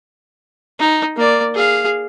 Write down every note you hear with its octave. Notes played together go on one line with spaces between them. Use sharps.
D#4
A#3 D5
G#4 F5